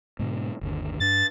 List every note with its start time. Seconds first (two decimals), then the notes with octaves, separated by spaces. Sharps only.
0.19 G#2 B2 D3
0.61 G1 D#2 D3
1.00 G2 D4 A6